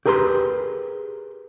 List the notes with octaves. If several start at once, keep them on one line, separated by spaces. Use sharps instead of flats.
G4 G#4 A#4 B4 B5 C6